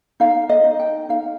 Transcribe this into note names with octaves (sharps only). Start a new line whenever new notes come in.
D#4 F5
D#5
D#4
G5
D#4 F5